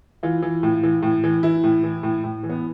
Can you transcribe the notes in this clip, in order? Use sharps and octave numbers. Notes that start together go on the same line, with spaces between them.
E3 F4
E3
A2
E3
A2
E3
E3 E4
A2
E3
A2
A2
E3
B3